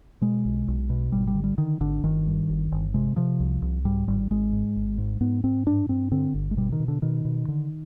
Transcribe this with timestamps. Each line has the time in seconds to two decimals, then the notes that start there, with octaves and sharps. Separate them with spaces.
0.21 B2 G#3
0.45 B1
0.68 B1
0.90 B2
1.12 G#1 G3
1.27 G3
1.35 D3
1.44 G3
1.58 D3 D#3
1.80 G#1 D3
2.03 G1 D#3
2.27 G2
2.50 G1
2.72 G1
2.94 C3 G#3
3.16 C3 F3
3.40 C2
3.62 C2
3.85 G#2 G3
4.08 G#1 G3
4.31 G#1 G#3
4.53 G#2
4.76 G#1
4.98 G#2
5.21 G#2 B3
5.44 G#2 C4
5.66 G2 D4
5.89 G2 C4
6.12 D3 C4
6.34 G1
6.51 G#3
6.57 B2 G3
6.72 D#3
6.80 B2
6.88 D3
7.02 B2 D#3
7.25 B2
7.48 D3